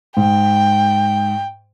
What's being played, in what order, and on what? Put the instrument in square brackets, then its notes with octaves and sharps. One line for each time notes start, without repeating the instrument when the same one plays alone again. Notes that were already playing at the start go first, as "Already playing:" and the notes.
[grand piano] G#2 [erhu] G5